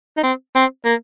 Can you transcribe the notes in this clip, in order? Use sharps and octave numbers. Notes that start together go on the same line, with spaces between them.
D#4
C4
C4
A#3